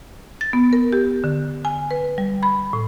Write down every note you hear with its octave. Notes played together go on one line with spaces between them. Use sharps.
A6
B3
A#4
G4
D3
G#5
B4
G3
B5
A2